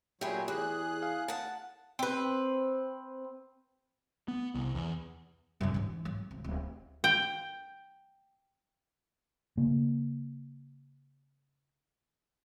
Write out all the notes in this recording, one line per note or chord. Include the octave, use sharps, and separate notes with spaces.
A#2 F#3 G4 G#4 E5 G5 B5
E2 G4 G#4 F#6
F5
F#5 A5
C4 B4
B3
C2
E2
F#2 D3
G#2 E3
F#3
G#1
D1
G5
C#3 A#3